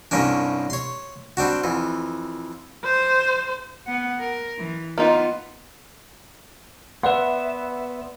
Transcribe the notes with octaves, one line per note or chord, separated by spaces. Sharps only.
C2 G2 A#3 C#4 D4
C#5 C6
G3 C4 D4 F#4
F2 E3
C5
B3 F#5
A#4
E3
A#3 B3 D#4 F4
B3 B4 D5 E5 F#5 C6